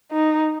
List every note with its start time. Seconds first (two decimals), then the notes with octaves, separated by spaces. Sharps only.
0.11 D#4